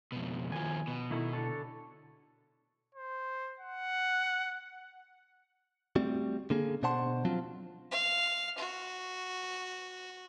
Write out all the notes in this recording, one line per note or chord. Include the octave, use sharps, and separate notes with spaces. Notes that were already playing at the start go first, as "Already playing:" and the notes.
F2 B2
D#2 F3 G#5
B2
D#3 A3 E4
D3 A4 C#5
C5
F#5
G3 A3 C4 F#4
D3 A#3 G#4
B2 D4 C5 F#5 A5 C6
F3 F#3 C4 F4
F5
F#4